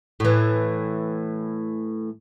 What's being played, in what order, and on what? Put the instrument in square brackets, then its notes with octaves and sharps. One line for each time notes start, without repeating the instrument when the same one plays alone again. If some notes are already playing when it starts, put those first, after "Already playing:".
[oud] A2 E3